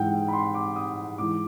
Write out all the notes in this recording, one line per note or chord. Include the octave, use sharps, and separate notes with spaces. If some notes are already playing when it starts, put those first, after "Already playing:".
Already playing: G#2 E3 F#5 G5
B5
C6
D6
D#6
G#2 E3 D6